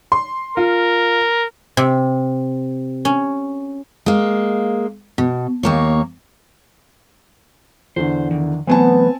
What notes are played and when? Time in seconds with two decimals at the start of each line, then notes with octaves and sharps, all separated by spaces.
0.12 C6
0.57 F4 A#4
1.77 C3
3.05 C#4
4.06 G#3 A#3
5.18 B2
5.63 D#2 A#3 C#5
7.96 E2 D3 C5
8.31 D#3 E3
8.67 E3 F#3 A3 B3 C4 G#5 A5